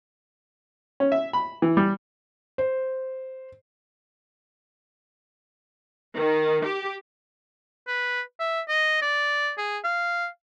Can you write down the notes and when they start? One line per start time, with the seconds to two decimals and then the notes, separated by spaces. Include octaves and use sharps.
1.00 C#4
1.12 E5
1.33 B5
1.62 E3
1.77 G3
2.58 C5
6.17 D#3
6.64 G4
7.88 B4
8.40 E5
8.69 D#5
9.02 D5
9.58 G#4
9.84 F5